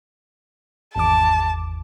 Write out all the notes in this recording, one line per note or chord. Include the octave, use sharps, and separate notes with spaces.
G#1 E2 A5 D6